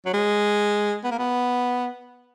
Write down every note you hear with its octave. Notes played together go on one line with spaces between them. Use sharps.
F#3
G#3
B3
A#3
B3